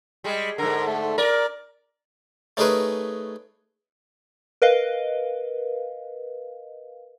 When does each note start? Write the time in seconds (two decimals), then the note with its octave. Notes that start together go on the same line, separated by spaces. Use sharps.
0.24 G3 G#3
0.58 G#2 D3 A#4
0.86 A3
1.18 A#4 D5
2.57 A3 C#4 D#4 G#4 A#4 B4
4.62 A#4 B4 D#5 F5